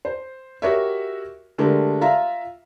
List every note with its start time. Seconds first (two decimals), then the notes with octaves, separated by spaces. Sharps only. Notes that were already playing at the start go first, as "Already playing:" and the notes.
0.05 C5
0.62 F#4 G4 A#4 C#5 D#5 E5
1.58 D3 G#3 A3 G4 A#4
2.01 F4 E5 F5 A#5